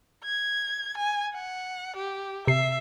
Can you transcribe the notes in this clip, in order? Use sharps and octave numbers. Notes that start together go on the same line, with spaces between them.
G#6
G#5
F#5
G4
C3 E5 C7